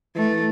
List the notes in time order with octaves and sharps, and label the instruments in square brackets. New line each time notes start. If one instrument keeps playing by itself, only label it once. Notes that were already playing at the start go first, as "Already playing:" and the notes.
[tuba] E3 [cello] A3